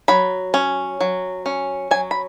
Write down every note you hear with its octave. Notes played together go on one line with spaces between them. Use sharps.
F#3 B5
C#4
F#3
C#4
F#3 G#5
B5